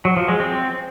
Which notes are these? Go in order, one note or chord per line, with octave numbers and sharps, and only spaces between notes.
F#3
F3
G#3
C4